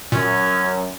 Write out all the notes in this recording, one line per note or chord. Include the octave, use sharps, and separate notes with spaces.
F#2 A#2 C#4